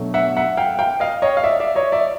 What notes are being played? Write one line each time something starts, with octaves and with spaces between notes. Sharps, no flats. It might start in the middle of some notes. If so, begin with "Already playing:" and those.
Already playing: B2 F#3 A3 D4
E5 F#5
E5 F#5
F5 G5
F5 G5
D#5 F5
C#5 D#5
F5
D5 E5
D5 E5
C#5 D#5
D5 E5